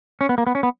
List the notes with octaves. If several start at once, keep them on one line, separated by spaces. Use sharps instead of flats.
C#4
B3
A#3
B3
C#4
B3